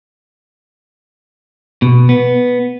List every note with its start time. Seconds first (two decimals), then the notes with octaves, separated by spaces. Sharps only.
1.82 B2
2.09 B3